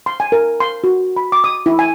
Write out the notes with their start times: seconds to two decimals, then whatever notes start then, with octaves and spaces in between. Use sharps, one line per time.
0.06 C6
0.20 G#5
0.32 A#4
0.60 C6
0.84 F#4
1.16 B5
1.32 D6
1.44 D#6
1.66 E4
1.79 G#5